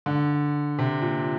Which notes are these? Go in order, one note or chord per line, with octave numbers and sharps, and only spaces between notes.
D3
C3
A#2